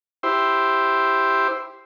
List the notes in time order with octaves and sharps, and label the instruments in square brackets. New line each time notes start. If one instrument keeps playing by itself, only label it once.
[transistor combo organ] E4 G4 C5